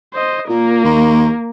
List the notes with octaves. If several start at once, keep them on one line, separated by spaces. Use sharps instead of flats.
C5 D#5
A#2 A#3 A#4
D#2